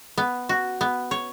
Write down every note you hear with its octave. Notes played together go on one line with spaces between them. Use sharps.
B3
F#4
B3
C#5